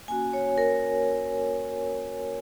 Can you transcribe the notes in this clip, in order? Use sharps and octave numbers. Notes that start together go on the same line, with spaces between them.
A#3 C#4 F#4 G#5
C#5
A#4